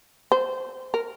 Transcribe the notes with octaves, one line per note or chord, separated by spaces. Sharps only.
C5
A#4